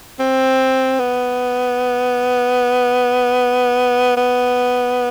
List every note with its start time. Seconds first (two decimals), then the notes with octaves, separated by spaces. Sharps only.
0.20 C4
0.99 B3
4.17 B3